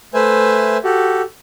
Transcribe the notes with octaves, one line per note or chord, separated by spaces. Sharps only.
A3 B4 C5 E5 G#5
F#4 G4 A4